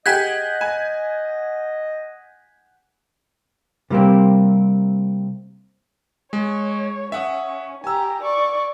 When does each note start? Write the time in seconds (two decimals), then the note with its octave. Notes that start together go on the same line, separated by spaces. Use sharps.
0.06 G4 G#4 D#5 F#5 G#5 G6 G#6 B6
0.61 G#5
3.90 C3 G3 A#3 C4
6.33 G#3 C#5
7.12 C#4 E5 F#5 D#6
7.84 G4 G#5 A#5 E6
8.22 D5 C#6